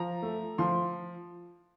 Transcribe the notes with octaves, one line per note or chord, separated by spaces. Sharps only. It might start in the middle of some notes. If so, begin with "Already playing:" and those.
Already playing: F3 A#5
A3
F3 C6